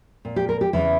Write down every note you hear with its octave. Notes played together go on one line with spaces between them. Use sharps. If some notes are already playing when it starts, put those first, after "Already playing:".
A#2
G4
A#4
G4
E2 C#3 E3 E4